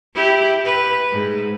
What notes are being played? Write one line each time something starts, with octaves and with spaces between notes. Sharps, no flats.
E4 G4
B4
G#2